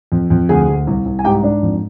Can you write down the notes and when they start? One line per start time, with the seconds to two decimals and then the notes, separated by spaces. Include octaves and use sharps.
0.12 F2
0.30 F2
0.49 D2 G#4 G#5
0.68 D2
0.87 C2
1.06 C2
1.19 G#5
1.24 G#2 G4 G5
1.43 G#2 D4 D5
1.63 F2